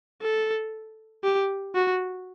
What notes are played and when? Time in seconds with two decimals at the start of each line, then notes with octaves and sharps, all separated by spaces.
0.22 A4
1.23 G4
1.75 F#4